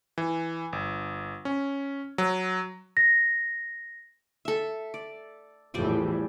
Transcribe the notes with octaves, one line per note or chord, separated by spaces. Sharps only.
E3
G1
C#4
F#3
A#6
A4 E5
D5
E2 A2 E3 F3 G3 D5